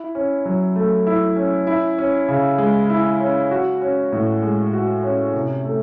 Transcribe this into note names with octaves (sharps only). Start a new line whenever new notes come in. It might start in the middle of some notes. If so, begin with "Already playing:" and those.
Already playing: E4
C#4
F#3
A3
E4
C#4
E4
C#4
C#3
G#3
E4
C#4
F#4
C#4
A2
G#3
F#4
C#4
C3
A3